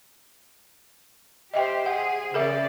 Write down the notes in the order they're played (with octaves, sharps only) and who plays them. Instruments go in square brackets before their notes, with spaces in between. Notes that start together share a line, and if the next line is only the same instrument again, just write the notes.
[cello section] G4 C5 [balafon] D#5 E5 G5
[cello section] G#4 [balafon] F#5
[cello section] C#3 D5 [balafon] G#4 A#4 E5